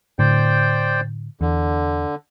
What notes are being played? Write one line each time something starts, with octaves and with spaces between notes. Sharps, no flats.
A2 D3 C5 D5 G5
E2 D3